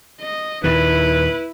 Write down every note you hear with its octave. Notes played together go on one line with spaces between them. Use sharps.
D#5
D#2 A#2 D#3 E4 B4